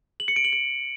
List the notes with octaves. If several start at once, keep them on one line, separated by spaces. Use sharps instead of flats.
F#7
C#7
D7
F#7
D7